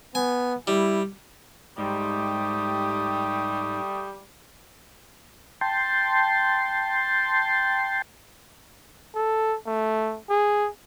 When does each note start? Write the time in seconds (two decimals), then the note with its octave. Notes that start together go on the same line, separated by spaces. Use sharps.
0.15 B3 G#5
0.67 G3 E4
1.78 G#2 G3 A3 G4 D#6
5.61 G5 A5 C6
9.15 A4
9.66 A3
10.29 G#4